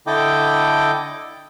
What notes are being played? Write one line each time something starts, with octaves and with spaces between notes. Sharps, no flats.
D3 E4 A4 D#5 G5 D6